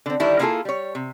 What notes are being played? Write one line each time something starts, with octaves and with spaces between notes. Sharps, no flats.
D3 C4
D3 D#3 G3 D4 E4
A#3 B3 E4 F4 G#4 A4
G3 C#5
C3